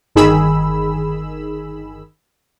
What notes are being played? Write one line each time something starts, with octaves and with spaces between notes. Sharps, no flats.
G1 D#3 G#4 B5 E6